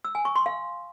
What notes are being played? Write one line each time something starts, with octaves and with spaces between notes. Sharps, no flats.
E6
G#5
C#6
C6
F5